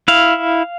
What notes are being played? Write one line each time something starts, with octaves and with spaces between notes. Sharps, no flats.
E4 F5